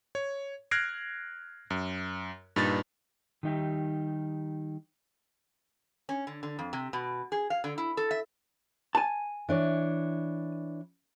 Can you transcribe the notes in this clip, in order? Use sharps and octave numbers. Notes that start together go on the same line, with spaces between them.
C#5
F6 F#6 G#6 A#6 C7 D7
F#2
G2 A#2 D#4 B4 A6
D#3 G3 D#4 G4 E5
C#4
D3
D3
F2
C3
B2
G#4
F5
D3
E4
A4
E5
G#5 A5
E3 D4 C#5